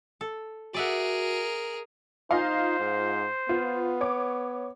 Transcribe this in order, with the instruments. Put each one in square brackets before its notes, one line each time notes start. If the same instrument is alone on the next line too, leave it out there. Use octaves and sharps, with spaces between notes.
[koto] A4
[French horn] F#4 [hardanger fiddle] G#4 A#4 [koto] D5 E5 F#5
[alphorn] D#4 [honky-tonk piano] F4 D#5 F5 [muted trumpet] C5
[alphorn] G#2
[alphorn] B3 [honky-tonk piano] F4
[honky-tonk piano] C#5 D6